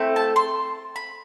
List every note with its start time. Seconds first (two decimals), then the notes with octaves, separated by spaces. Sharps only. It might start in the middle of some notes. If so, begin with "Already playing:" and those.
Already playing: A3 C4 E4 A4
0.16 A5
0.36 C6
0.96 B5